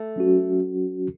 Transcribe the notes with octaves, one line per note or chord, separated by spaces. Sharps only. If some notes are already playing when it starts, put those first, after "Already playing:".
Already playing: A3
F#3 C#4 F#4